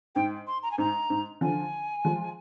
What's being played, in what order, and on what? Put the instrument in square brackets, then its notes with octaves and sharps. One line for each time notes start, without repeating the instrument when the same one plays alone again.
[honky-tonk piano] G#2 [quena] G5
[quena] C6
A#5
G#5
[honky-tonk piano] G#2 [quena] A#5
[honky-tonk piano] G#2
[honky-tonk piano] D3 F3 [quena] G#5
[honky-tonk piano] F3 G#3